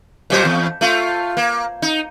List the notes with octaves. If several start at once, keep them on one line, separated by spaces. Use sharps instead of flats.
A#2 F#3 C5
E2
A3 F4
A#3
D#4